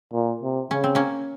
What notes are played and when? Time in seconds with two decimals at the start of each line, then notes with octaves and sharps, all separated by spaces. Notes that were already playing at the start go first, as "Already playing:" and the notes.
0.13 A#2
0.42 C3
0.71 C#3 C#4
0.84 C4
0.95 A#3 C#4